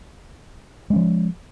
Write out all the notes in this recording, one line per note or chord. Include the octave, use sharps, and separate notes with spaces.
F3 G#3 C#4